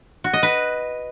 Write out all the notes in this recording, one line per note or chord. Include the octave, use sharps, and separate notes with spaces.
F#4
D#5
B4